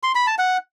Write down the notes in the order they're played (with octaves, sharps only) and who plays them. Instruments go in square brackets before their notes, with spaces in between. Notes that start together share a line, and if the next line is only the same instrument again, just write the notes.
[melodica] C6
B5
A5
F#5